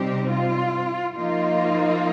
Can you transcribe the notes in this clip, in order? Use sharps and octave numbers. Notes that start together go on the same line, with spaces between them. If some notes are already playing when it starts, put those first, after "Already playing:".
Already playing: C3 G3 C4 D#4 G4
F4
F3 A#3 D#4 F4